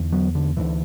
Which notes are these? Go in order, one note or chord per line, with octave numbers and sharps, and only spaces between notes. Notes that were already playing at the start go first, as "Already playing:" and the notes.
Already playing: E2 D3
F#3 B3
D3
D2 D3 E3